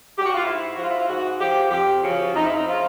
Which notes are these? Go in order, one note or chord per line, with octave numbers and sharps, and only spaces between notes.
G4
F#4
F4
G#2 E4
F3 F#4
F4
E4
F4
G#2 F#4
F3 G4
F2 G4
C#3 F3 F#4
F2 D#4
E4
D#4
C#3 F3 F4